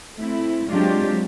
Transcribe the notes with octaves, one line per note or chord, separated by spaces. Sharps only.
A3 C4 E4
F#3 G#3 C4 D4 F4 G4